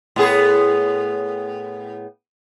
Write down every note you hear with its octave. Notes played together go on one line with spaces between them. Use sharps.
A2 B3 G#4